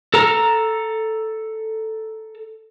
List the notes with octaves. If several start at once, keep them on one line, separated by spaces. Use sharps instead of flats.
A4 A#5